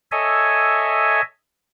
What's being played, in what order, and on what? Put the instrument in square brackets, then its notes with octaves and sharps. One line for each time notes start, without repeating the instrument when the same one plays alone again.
[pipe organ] A4 C#5 D#5 E5 G#5